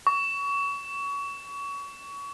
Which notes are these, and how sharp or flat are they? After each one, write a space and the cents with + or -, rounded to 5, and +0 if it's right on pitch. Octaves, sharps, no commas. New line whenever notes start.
C#6 +25